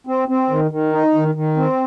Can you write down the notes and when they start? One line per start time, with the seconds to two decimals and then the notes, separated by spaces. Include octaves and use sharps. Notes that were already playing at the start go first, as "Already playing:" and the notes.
0.07 C4
0.28 C4
0.50 D#3
0.71 D#3
0.92 D#4
1.15 D#3
1.35 D#3
1.57 C4